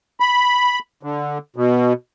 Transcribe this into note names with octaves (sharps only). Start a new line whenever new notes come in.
B5
D3
B2